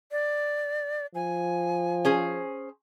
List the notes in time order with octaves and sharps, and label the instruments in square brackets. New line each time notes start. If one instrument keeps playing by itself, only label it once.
[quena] D5
[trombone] F3 [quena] G#5
[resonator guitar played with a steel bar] C#4 G#4 C5